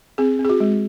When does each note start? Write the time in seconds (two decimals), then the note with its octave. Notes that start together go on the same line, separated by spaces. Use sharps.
0.18 C4 G#4
0.39 C4
0.45 G#4
0.49 F#4
0.60 G#3